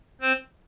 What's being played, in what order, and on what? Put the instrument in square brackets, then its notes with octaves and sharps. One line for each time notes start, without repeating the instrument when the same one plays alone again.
[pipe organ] C4 C5